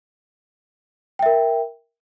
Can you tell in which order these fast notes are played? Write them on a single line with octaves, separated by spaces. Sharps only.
G5 E5 A#4